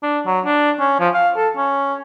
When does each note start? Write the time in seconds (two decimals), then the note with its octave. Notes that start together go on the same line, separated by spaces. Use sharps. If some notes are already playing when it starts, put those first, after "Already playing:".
0.02 D4
0.26 F#3
0.45 D4
0.79 C#4
1.00 F3
1.14 F5
1.36 A4
1.56 C#4